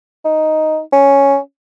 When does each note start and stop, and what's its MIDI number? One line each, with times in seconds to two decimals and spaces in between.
0.25 0.80 63
0.93 1.38 61